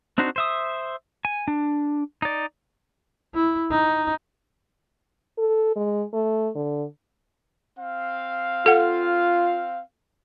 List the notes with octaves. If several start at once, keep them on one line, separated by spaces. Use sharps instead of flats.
C4 D4 D#4 F#4 C5
C5 E5 D#6
G#5
D4
D#4 D5
E4
D#4
A4
G#3
A3
D3
C4 F5
F4 A4 F#5